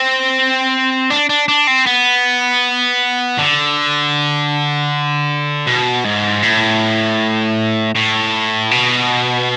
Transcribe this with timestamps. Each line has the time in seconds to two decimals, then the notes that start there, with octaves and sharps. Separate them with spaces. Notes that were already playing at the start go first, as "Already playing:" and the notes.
Already playing: C4
1.11 D4
1.29 D4
1.48 D4
1.67 C4
1.86 B3
3.38 D3
5.67 B2
6.05 G#2
6.43 A2
7.95 A2
8.71 B2